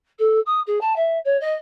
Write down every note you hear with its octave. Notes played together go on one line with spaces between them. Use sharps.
A4
D#6
G#4
A5
E5
C#5
D#5